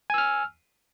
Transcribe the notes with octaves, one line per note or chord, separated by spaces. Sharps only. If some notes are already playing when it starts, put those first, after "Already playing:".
G#5 E6 F6